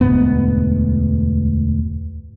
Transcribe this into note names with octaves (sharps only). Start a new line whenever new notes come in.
E1 D2 G#2 B3